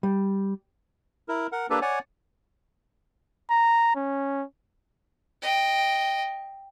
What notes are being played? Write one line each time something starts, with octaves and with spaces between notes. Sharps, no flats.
G3
E4 A#4
A#4 F#5
A#3 D4 G4 A4 B4
C#5 D5 F#5 G#5
A#5
C#4
D#5 G5